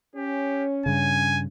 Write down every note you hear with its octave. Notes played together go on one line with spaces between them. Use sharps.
C#4 G4
G2 C#3 G#5